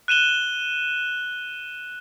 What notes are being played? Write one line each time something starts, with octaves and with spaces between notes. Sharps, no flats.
F#6 D#7 E7 G7